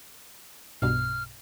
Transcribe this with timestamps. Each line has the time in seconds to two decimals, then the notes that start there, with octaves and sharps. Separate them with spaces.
0.82 B1 G2 B2 F6